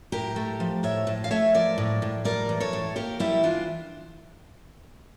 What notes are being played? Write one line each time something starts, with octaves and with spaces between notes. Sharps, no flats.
A2 G4 A#4
A3
F3
A2 C#5 E5
A2
F5
A3 C#5 E5
F3 A#4 D5
A2
A2
G3 A#4 D5
E3
A4 C#5
A2
A#3 G4 A#4
G3 E4 G4
E3 D4 F4